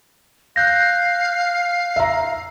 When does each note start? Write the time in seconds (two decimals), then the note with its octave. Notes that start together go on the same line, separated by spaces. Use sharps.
0.56 F5 F#6 G6 A#6
1.96 E5 A#5